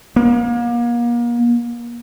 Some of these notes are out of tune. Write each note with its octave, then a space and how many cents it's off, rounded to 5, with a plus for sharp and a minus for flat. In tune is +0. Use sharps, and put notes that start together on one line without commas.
A#3 +35